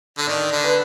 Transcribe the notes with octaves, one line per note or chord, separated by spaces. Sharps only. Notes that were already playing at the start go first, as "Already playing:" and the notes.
D3
D#3 D5
D3
B4